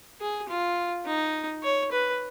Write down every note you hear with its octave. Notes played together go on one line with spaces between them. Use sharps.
G#4
F4
D#4
C#5
B4